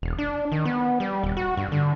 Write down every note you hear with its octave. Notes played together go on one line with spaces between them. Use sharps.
E1
D4
D#3
B3
G3
D#1
F#4
G2
D3